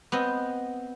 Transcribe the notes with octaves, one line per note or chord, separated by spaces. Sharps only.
B3 C4 D#5